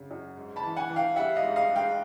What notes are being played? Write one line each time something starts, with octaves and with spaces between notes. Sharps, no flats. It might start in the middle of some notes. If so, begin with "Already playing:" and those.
Already playing: F#2 C#3
F#2
G#2
A5 B5
E3
F#5 G#5
E3
F5 G5
G3 E5 F#5
D#5 F5
G#2
D#5 F5
G#2
F5 G5